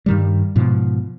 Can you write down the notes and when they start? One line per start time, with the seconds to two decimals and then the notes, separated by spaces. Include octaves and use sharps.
0.06 G2 D#3 G3
0.56 G#2 B2 F3